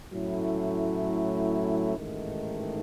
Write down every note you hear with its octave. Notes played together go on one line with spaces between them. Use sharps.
A2 F#3 A3 C#4 E4
A1 G#2 D#3 A3 D#4